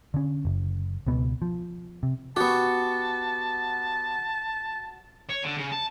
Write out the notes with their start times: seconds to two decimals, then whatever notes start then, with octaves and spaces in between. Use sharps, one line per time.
0.14 D3 C#4
0.45 F#1
1.07 C#2 B2 B3
1.42 F3
2.03 C3
2.36 B3 F#4 G4 A5 C#6
5.30 C#5
5.44 D3
5.57 C#3
5.72 A5